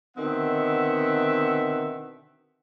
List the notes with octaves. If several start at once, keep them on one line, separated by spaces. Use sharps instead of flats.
B2 D3 D#3 C4 E5 F#5